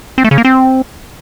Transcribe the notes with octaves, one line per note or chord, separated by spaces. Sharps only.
C4
A3
C#3
A#3
C4